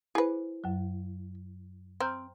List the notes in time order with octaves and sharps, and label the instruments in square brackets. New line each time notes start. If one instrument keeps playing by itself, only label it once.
[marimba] E4 C5 [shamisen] G#4 B4
[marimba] F#2 F#3
[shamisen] C4 [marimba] A#5 F6 G6